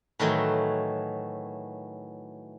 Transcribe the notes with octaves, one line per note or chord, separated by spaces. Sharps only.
A2 D#3 E3 F#3